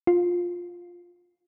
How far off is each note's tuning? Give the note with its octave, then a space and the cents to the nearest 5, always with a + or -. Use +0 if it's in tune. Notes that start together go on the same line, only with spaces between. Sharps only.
F4 +10